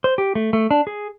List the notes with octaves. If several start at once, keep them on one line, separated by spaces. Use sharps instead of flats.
C5
G4
A3
A3
D4
G#4